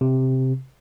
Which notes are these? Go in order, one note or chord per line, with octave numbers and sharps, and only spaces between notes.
C3